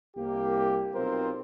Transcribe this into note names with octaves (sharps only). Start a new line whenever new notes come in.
C2 A#3 G4
B1 C4 D#4 F4 A#4 C5